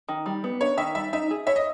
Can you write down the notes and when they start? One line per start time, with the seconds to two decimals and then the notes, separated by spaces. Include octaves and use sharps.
0.09 D#3
0.26 G3
0.44 B3
0.61 D4 C#5
0.77 D#3 E5
0.95 G3 E5
1.13 D#4 E5
1.31 G#4
1.47 C#5 E5
1.56 D#5